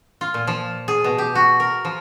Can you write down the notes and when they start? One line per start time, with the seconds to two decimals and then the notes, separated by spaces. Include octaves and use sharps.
0.21 F4
0.34 A#2
0.47 F3
0.88 G#4
1.04 B2
1.18 G4
1.35 F#4
1.60 A#4
1.85 F3